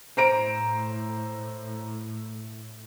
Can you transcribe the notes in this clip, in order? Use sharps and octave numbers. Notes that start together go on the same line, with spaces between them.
A2 C5 A#5 D7